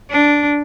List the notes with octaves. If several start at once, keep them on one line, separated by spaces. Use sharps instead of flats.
D4